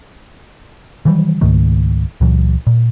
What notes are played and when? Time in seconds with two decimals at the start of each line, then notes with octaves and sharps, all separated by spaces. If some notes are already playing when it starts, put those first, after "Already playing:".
1.05 D#3 E3 F#3 G3
1.41 C#2 G#2 D#3 A3
2.21 C#2 A#2 E3 F#3
2.67 A#2